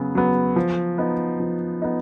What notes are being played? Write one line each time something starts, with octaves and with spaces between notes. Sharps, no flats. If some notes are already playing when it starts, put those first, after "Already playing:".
Already playing: C#3 F#3 B3
F#3 B3
F3
B3 D#4
F3
B3 D#4